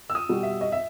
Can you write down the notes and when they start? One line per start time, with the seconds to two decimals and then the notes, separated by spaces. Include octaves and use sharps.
0.10 E6
0.15 D#6
0.29 B2 G3
0.43 E5
0.61 D#5
0.72 E5